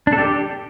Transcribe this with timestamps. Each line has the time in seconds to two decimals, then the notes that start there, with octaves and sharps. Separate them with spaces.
0.07 D4
0.13 A4
0.18 G4